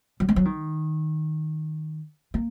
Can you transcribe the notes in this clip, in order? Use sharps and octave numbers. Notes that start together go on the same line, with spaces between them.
F#3
G#3
F#3
D#3
A#3